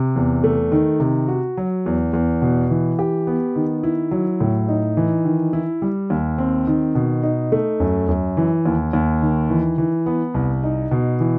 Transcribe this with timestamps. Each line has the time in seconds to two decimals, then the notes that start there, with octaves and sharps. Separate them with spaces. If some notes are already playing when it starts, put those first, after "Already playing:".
Already playing: C3
0.16 E2
0.44 A3
0.72 D#3
1.00 C3
1.28 F#4
1.57 F#3
1.86 E2
2.13 E2
2.42 B2
2.71 E3
2.99 G4
3.27 B3
3.56 D#3
3.83 E4
4.11 F#3
4.41 A2
4.68 D#4
4.97 E3
5.25 D#3
5.53 E4
5.82 G3
6.10 D#2
6.38 C4
6.67 D#3
6.95 B2
7.23 D#4
7.52 A3
7.80 F#2
8.09 F#2
8.37 E3
8.65 D#2
8.93 D#2
9.22 D#3
9.50 E3
9.78 E3
10.06 B3
10.34 C2
10.63 D#4
10.91 B2
11.20 E3